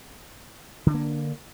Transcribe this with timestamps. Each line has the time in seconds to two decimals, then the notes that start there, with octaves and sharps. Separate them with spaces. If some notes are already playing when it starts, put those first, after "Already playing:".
0.86 D3
0.90 D4
0.94 A#3